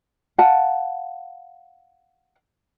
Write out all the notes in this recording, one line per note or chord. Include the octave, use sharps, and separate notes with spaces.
F5 F#5 A5